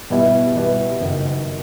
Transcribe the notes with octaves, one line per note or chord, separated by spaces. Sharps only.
B2 G3 B3 E4
B2 G3 B3 E4
F#1 F#2 D#3